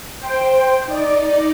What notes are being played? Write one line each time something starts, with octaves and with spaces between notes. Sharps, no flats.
C5 G5
D#4 D5